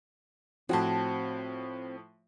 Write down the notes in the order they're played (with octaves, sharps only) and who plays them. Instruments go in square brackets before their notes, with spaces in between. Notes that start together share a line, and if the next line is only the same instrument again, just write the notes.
[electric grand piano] A2 F3 [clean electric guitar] C4 [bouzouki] E4 F#5 A5 [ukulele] F#4